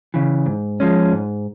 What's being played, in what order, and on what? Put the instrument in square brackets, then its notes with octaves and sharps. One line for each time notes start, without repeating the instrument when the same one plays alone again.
[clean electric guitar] C#3 E3
G#2
F3 G#3 C#4
G#2